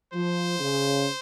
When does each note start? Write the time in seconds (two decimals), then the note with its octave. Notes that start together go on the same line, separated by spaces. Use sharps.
0.13 F3 C5
0.59 C#3